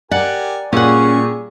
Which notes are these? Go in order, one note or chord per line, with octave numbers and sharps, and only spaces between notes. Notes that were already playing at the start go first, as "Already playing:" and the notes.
G4 A#4 D5 F#5 G#5
A#2 G3 C#4 G#4 F#5 C#6